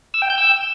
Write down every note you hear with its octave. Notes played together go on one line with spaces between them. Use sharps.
E6
G5
G6
E6